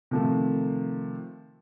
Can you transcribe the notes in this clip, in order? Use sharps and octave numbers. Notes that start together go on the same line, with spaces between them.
C3 D#3 F3 A3